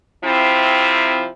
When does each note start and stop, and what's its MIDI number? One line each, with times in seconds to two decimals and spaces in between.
0.25 1.28 48
0.25 1.28 53
0.25 1.28 60
0.25 1.28 64